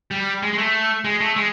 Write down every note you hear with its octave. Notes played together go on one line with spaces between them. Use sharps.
G3
G#3
G#3
A3
G#3
A3
G#3